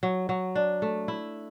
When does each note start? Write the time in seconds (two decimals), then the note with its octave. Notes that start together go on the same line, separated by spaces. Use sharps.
0.03 F#3
0.29 F#3
0.55 D4
0.82 A3
1.08 E4